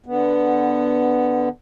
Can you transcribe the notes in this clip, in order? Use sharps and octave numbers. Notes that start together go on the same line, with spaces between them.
D3 B3